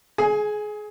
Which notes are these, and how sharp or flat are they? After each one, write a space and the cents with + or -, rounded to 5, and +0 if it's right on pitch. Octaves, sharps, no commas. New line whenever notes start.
G#4 +25 G#5 +0